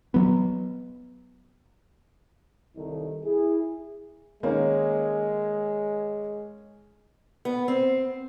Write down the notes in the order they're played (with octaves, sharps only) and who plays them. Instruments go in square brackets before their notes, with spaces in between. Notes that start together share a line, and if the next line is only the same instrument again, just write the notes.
[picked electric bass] F#3 B3
[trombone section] C2 D#3 D#4 A4
E4 G#4
[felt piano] D#3 A#3 [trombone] G#3 [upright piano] C#4
[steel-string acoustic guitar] B3
C4